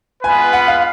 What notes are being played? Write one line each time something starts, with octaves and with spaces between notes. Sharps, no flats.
G#3 B3 F4 B4 G#5
F#5
F5